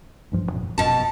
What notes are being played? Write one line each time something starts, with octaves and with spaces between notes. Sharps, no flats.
A1 G2 F3
E1 F2 A#2
F1 B2 A5